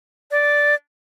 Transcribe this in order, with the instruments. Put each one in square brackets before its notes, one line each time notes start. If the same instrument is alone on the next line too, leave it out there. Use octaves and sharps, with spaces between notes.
[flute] D5